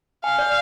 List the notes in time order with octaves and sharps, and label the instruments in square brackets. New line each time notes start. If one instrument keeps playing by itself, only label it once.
[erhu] F5 [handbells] G#5
[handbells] D5